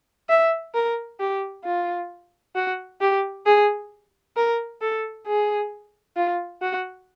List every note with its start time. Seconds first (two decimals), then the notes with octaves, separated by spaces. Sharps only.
0.29 E5
0.74 A#4
1.20 G4
1.65 F4
2.55 F#4
3.01 G4
3.46 G#4
4.36 A#4
4.81 A4
5.27 G#4
6.16 F4
6.62 F#4